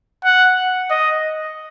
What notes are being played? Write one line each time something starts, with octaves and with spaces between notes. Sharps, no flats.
F#5
D#5